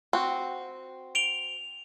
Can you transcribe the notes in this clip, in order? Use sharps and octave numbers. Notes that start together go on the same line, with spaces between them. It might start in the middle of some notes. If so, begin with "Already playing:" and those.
C4 F#4
D7 F7 G7